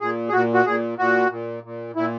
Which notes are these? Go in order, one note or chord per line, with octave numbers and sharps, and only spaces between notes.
A#2 G#4
G#4
A#2 F#4
F#4
A#2 G#4
A#2 F#4
A#2
A#2
A#2 E4